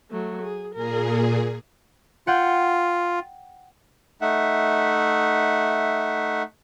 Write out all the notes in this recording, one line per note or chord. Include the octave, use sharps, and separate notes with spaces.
F#3 A3
G#4
A#2 G#4 A#4
F4 F#5 G5
A3 D#4 E5 F#5